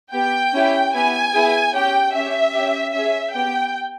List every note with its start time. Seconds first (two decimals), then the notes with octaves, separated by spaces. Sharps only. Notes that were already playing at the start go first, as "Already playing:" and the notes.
0.14 B3 G4 G5
0.53 C#4 E4 G4
0.94 B3 E4 G4 G#5
1.34 B3 E4 G#4
1.74 C#4 G4 G5
2.14 C#4 G4 E5
2.55 C#4 G4
2.94 C#4 G#4 E5
3.34 B3 G4 G5